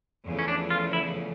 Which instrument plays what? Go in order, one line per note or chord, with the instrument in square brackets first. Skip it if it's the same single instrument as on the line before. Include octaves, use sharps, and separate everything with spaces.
[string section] E2 C#3 F3 A3
[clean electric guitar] C#4
D4
F4
E4